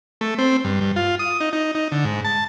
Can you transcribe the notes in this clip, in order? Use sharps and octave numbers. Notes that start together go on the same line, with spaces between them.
A3
C4
G2
G2
F4
D#6
D#4
D#4
D#4
D3
G#2
A5